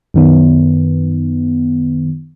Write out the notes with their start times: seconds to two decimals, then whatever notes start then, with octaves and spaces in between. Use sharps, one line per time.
0.14 F#2 D#3 B3